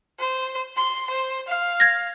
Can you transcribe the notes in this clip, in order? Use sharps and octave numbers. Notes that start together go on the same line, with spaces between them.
C5
C6
C5
F5
G#6 A#6